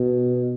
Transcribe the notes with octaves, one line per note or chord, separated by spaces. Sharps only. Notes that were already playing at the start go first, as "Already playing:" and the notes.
Already playing: B2